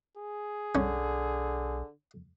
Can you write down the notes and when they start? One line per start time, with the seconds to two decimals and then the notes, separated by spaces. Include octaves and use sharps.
0.17 G#4
0.75 B1 D3 C#4